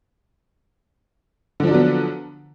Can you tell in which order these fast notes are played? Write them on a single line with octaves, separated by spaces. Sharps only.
D3 F3 D4 F#3 B3